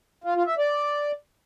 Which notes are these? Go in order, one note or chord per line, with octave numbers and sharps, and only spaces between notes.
F4
F4
E5
D5